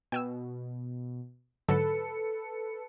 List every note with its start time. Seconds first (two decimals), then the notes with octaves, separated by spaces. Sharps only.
0.12 B2 G5 G#5 E6
1.68 G#2 D3 F#3 A4 B4 C#7